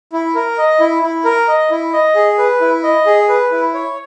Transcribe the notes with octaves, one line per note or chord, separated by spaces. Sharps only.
E4
A#4
D#5
E4
E4
A#4
D#5
E4
D#5
G#4
B4
E4
D#5
G#4
B4
E4
C#5